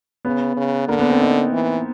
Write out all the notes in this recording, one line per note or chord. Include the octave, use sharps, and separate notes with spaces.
C#3 B3
C#3
D3 A#3
B3
C4
D#4
E3